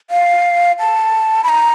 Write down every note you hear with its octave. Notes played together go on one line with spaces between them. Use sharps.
F5
A5
B5
A#5